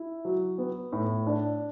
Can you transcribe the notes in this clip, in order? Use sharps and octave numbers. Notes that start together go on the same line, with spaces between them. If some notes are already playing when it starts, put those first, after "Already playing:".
Already playing: E4
F#3
B3
A2
D4